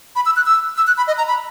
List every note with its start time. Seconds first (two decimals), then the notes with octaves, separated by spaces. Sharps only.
0.16 B5
0.26 E6
0.36 F#6
0.46 E6
0.77 E6
0.87 F#6
0.97 B5
1.07 D#5
1.18 A#5
1.28 B5